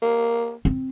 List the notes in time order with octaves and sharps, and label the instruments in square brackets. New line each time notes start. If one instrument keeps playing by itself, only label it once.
[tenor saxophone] A#3
[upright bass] C4